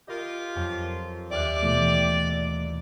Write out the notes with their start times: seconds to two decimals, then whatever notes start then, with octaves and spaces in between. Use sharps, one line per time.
0.08 F4 G4 A#4 D#5 C6
0.56 F2 F#3 C4
1.31 D#2 G4 D5 E5 F5 D6 F#6
1.63 B2 E3 A3